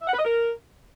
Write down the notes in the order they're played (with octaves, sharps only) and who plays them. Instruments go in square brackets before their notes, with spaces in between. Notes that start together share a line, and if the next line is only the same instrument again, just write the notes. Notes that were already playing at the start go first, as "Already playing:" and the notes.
[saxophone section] E5
F#5
B4
D#5
A#4